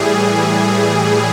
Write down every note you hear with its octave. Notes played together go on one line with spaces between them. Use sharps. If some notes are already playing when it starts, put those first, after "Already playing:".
Already playing: A2 E3 G3 G#4